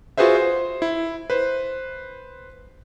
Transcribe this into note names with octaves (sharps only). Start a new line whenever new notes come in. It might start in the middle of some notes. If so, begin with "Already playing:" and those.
F4 F#4 G#4 B4 C5 E5
C5
E4
B4 C5